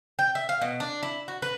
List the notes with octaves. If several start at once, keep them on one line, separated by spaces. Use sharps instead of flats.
G5
E5
F5
B2
D4
E4
F#4
B4